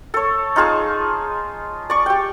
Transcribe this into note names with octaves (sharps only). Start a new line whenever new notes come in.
A4 C#5
D#4 F4 G#4 A5
D5 C#6
G4 G5